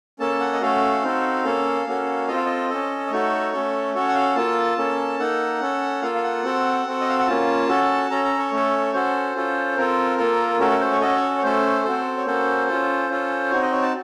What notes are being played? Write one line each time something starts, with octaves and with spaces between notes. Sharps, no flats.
A#3 C#4 A4 A5
F#5
D#5
A3 C#4 F#4 A4 F5
C4 D#4 F#4 A4
A#3 C#4 A4
A#3 C#4 F#4 A4
C4 F4 A4 D#5
F5
D#5
C#4 A4
D#5
A3 D#4 F#4 A4 C#5
A3 C#4 A4
C#4 F#4 A4 C#5
F#5
F5
A#3 F4 A4 A5
A#3 C#4 A4
A#3 D#4 A4 F#5
C#4 A4
A#3 F4 A4 F5
F5
F#5
C4 F#4 A4
C4 F#4 A4
D#5
F5
F#5
A#3 C#4 F4 A5
C#4 F#4 A4
C#4 A4 A#5
A#5
C#5
A3 C#4 A4
C#4 F#4 A4 C5
C#4 F4 A4
C4 F4 A4 A#4
A#3 F4 A4
A3 C#4 F#4 A4 A#4
A#4
C5
C#5
C#4 F#4 A4 D#5
C#5
C#5
A3 C#4 A4 C5
C4 F#4 A4
C#5
A#3 C#4 F#4 A4 C5
C#4 F4 A4
C#4 F4 A4
C4 D#4 F#4 C#5
D#5
C#5
A5